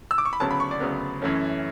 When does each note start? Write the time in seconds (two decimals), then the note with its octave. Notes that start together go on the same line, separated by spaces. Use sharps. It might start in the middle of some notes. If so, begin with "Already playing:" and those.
0.11 E6
0.18 D6
0.25 C#6
0.33 B5
0.40 D2 C#3 F#3 B3 A5
0.51 B5
0.60 C#6
0.71 D5
0.80 D2 C#3 F#3 B3
1.22 F#2 E3 A3 C#4